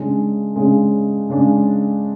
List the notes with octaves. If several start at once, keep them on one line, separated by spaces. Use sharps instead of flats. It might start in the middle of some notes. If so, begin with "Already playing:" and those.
Already playing: C#3 G#3 D4
C#3 G#3 D4
C#3 G#3 D4